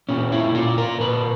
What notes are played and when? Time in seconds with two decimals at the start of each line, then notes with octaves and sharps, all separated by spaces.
0.09 A#2 C#4
0.32 E4
0.55 A#2 F4
0.78 A#4
1.00 A#2 B4